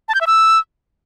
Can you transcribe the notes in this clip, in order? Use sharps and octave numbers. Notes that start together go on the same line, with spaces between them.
A5
G6
E5
E6